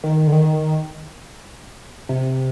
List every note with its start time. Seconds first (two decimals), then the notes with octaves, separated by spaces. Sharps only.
0.04 D#3
0.27 D3
0.32 D#3
2.09 C3